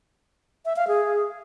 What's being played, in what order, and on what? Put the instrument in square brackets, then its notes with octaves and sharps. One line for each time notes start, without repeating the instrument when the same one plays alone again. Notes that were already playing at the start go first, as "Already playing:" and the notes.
[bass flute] E5
F5
G#4